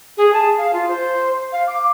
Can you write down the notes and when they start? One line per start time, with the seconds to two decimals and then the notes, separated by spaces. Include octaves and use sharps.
0.17 G#4
0.33 A5
0.58 F5
0.73 F4
0.88 C5
1.52 F5
1.68 D6